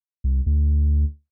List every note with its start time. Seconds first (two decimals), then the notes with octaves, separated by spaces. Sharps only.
0.24 C2
0.46 D2